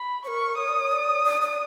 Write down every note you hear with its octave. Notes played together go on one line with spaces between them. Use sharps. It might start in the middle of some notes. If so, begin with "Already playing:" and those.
Already playing: B5
A#4 C#5 C#6
C#5 D#6
D5
C#5
D5
D5
D5